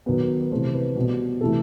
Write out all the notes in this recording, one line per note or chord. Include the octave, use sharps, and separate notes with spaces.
D#3 F#3 B3 B4
B4
C3 E3 A3 C5
B4
B2 G3 B3
C3 E3 A3 A4